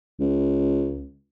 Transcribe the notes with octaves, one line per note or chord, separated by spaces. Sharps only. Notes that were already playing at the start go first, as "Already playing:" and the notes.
C#2